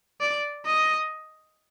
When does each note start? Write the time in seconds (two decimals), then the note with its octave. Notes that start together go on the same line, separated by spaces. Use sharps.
0.21 D5
0.66 D#5